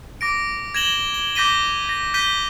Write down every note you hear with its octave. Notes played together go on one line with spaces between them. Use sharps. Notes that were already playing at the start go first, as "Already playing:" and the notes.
D6 A#6 D7
G#6 A#6 E7 F#7 G7
G7
D6 G6 A#6 B6 D#7 G7
A#6
G6 B6 D#7 G7